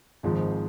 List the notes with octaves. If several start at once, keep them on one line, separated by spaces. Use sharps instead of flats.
G#1 G#2 F3 G#3